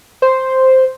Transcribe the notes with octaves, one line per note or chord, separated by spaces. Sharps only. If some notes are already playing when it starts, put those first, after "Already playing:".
C5